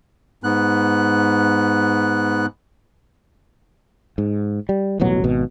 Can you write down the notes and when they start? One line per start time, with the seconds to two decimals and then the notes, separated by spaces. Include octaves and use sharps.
0.44 G#2 B3 F#6
4.18 G#2
4.69 G3
5.00 D#1 A1 B2 F#3
5.24 G#1 B2